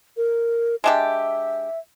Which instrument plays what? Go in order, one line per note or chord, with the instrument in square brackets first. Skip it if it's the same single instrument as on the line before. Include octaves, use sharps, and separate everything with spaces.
[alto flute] A#4
[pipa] G#3 D4 G4 [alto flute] E5